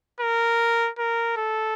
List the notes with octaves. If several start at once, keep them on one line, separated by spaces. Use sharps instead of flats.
A#4
A#4
A4